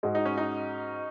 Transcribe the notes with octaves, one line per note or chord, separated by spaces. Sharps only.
G#2 G#3 F#4 D#5
D#4
C#4
D#4